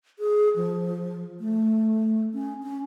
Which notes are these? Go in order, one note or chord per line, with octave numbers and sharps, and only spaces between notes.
G#4
F3
A3
C#4
C#4